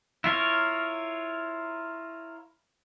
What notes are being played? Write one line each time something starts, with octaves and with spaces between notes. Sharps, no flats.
E4 F4 A#4 C#5